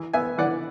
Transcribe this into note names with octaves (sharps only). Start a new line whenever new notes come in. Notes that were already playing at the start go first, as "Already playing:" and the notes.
Already playing: E3
B3 E5 G#5
E3 D5 F#5